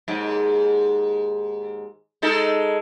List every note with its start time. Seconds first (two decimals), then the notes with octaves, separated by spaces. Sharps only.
0.08 D#2 G#2
2.22 G#3 D#4 A4